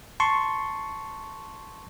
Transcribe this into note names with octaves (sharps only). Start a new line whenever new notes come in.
A5 C6 C#6